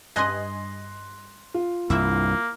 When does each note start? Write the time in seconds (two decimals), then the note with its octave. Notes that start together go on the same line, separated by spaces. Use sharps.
0.16 G2 D#5 G#5 C6 F#6 A#6
1.54 F4
1.90 C2 G2 A#3 E4 E5